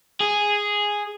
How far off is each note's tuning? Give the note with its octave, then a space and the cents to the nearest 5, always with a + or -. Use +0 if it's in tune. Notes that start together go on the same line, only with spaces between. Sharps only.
G#4 -5